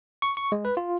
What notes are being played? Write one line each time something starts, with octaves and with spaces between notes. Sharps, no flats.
C#6
C#6
G#3
B4
F4